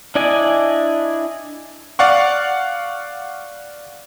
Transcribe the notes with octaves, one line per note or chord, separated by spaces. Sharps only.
D4 E4 D5 D#5 G#5
D5 F5 F#5 C#6